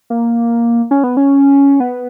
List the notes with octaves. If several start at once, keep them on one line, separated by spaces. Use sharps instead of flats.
A#3
C#4
B3
C#4
B3